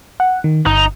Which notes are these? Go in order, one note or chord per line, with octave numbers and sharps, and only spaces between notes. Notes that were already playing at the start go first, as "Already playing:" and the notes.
F#5
D#3
G1 D#4